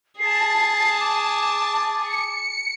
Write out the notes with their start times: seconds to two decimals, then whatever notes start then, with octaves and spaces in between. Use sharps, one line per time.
0.19 G#4 A5 C7
1.00 D6
2.01 C#7